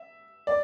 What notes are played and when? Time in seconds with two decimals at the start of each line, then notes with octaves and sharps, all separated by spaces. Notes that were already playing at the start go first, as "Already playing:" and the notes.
Already playing: E5
0.47 D5